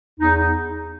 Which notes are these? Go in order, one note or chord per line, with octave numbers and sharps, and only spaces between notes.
E2 D#4
D#4